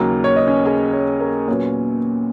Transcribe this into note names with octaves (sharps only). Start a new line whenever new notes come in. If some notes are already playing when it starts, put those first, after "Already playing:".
Already playing: D#2 C#3 F#3 A#3 A#4
C#5
D#5
C#4 C#5
G#4 G#5
C#4 C#5
A#3 A#4
A#2 F#3 B3 C#4 C#5